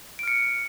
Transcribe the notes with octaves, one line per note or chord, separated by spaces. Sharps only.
F6 C#7 D7